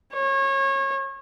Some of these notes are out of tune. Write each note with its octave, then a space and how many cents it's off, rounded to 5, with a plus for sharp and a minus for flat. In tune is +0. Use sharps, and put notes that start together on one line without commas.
C#5 -30